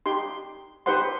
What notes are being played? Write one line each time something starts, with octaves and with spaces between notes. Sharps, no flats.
D#4 G4 C6
D#4 G4 B4 C5 F#5 C6